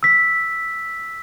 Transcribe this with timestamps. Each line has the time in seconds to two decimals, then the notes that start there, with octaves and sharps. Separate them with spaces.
0.03 E6 B6